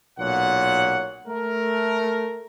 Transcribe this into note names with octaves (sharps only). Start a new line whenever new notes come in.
B1 A#2 C#5 F#5
A3 A#4